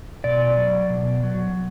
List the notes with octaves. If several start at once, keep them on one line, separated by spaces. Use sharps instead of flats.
B2 D5
F#3
B2
F#3